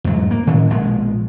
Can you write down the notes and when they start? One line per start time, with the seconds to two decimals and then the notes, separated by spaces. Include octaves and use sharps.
0.04 E2 G#2 F#3
0.31 A#3
0.47 A2 D#3 C#4
0.70 A#1 B2 G#3